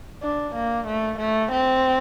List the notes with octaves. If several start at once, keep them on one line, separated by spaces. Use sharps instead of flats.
D4
A#3
A3
A3
C4